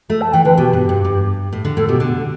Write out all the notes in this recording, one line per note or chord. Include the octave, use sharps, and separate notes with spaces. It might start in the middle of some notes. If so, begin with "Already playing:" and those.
A3 A4
A5
E3 G5
D3 B4
B2 G4
G2
G2
G2
A2
D3
A2 A4
B2 G4
D3